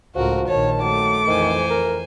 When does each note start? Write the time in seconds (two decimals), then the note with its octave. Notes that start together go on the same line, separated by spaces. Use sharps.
0.15 C#2 A2 F3 F#4 A#4
0.47 A#1 D#3 C#5 A5
0.81 F#3 A3 D6
1.27 F2 D#3 E3 C5 G#5
1.70 A#4